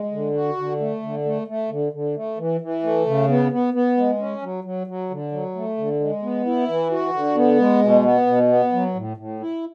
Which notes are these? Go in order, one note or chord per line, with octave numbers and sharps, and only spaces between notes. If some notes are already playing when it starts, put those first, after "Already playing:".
Already playing: G#3
D3
F#4
D3
A3
D3
A3
A3
D3
D3
A3
E3
E3
A3
C#3
B3
B3
B3
G#3
C#4
F#3
F#3
F#3
D3
F#3
A3
D3
G#3
B3
E4
E3
F#4
D3
B3
G#3
B2
B3
B2
B3
F#3
A2
A2
E4